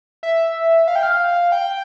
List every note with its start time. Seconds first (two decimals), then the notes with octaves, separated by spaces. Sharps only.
0.23 E5
0.88 F5
0.96 G5
1.03 F5
1.52 G5